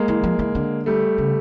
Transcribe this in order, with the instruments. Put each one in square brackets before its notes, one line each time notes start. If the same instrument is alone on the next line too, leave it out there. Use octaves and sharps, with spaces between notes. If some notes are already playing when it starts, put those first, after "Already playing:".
Already playing: [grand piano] G#3 A#3
[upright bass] E3
F3
E3
D3
[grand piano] G3 A3
[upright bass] C#3